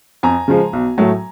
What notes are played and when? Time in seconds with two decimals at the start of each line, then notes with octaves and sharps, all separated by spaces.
0.23 F2 G#5 A#5
0.48 C#3 F3 G#3
0.73 B1
0.98 A2 F#3 A3